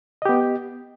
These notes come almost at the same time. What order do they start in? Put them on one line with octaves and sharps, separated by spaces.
D#5 G4 B3